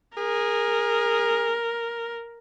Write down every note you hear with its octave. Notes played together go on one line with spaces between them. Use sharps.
G#4 A#4